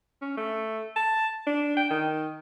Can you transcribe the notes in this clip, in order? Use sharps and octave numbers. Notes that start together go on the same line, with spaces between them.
C#4
A3
A5
D4
G5
D#3